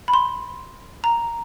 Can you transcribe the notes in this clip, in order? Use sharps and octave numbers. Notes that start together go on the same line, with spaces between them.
B5
C6
A#5